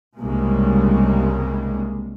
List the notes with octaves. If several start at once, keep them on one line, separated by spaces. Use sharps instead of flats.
C2 G2 C#3 G3 G#3 A#3